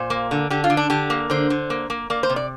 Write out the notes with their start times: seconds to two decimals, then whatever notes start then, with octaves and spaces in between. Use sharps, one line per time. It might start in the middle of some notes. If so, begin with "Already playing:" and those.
Already playing: A#2 C5
0.10 A#3
0.31 D3
0.50 D3 G4
0.64 F4
0.70 D3
0.77 D4
0.90 D3 G4
1.10 A#3
1.30 D3 C5
1.50 D3
1.70 A#3
1.90 A#3
2.10 A#3 D5
2.23 C5
2.30 C3
2.36 D5